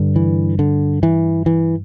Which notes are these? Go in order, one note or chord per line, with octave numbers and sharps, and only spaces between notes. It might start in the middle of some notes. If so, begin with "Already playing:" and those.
Already playing: G2 D3
E3
D3
E3
E3